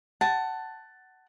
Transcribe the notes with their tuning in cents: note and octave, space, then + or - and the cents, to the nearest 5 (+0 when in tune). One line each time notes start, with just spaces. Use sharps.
F#5 +20 A5 +5